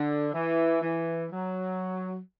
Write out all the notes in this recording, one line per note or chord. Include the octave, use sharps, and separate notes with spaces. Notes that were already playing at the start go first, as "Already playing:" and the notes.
Already playing: D3
E3
E3
F#3